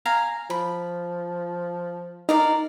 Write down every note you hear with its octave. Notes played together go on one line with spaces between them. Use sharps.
F5 G#5 A#5
F3 B5
D#4 A#4 D5 F5